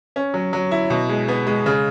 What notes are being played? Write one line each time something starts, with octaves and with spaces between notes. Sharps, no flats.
C#4
F#3
F#3
E4
B2
G#3
B3
G#3
C#3